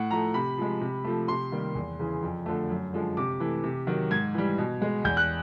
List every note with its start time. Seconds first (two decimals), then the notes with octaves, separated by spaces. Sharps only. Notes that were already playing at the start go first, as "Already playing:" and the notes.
Already playing: A2 F#5
0.11 F3 A3 A#5
0.34 C3 B5
0.58 F3 G#3
0.81 C3
1.04 F3 A3
1.28 C3 C6
1.52 D#3 G3 A#3
1.75 E2
1.99 C#3 E3
2.22 F2
2.46 D3 F3 A3
2.70 F#2
2.93 D3 F3 G#3
3.17 C3 D6
3.40 E3 A3
3.64 C3
3.87 D#3 F#3
4.11 G#2 G#6
4.34 E3 G3
4.58 B2
4.82 G#3
5.05 E2 G6
5.17 F#6